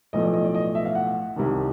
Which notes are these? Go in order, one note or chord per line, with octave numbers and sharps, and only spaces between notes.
B1 A2 F3 A3 D#5
D5
D#5
D5
D#5
E5
F5
F#5
C2 C3 D#3